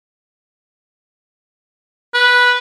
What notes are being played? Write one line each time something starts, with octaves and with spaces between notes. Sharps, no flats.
B4